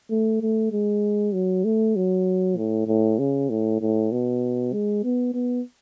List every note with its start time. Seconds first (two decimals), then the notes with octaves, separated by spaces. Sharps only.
0.10 A3
0.42 A3
0.72 G#3
1.34 F#3
1.64 A3
1.96 F#3
2.57 A2
2.88 A2
3.19 C#3
3.50 A2
3.81 A2
4.12 B2
4.73 G#3
5.04 B3
5.34 B3